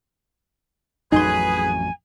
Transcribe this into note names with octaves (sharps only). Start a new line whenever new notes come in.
A1 F2 F#3 D#4 G#4 B4 G#5 C6